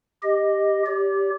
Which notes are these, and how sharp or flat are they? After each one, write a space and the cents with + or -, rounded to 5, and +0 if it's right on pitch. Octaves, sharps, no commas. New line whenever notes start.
G4 +10 D#5 +0
G4 +0 D5 -45